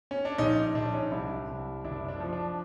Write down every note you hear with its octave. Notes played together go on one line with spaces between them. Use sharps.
C#4
D4
A#1 C#4 D#4
D4
A#1 D4
C#4 D#4
C2 D4 E4
C2
F#1 D4 E4
D4
F3
D4